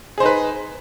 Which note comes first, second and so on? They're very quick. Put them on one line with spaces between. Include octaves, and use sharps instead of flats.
G#4 C5 D#4 B4